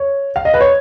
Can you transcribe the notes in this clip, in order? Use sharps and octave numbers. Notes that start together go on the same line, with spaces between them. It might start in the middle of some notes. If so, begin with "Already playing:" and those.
Already playing: C#5
F5
D#5
B4
C#5